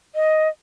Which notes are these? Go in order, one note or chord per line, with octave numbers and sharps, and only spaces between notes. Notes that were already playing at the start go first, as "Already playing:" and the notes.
D#5